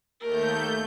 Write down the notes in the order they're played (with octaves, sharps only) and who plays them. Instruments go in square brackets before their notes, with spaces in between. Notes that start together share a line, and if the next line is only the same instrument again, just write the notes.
[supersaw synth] D#2 A3 G6 [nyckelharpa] A#4